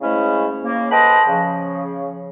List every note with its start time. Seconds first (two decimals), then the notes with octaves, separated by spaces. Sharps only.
0.01 G#2 C#3 G#3 A3 C#4 E4
0.63 C#3 A#3
0.91 A4 B4 C5 D#5 G5 B5
1.28 C#3 F3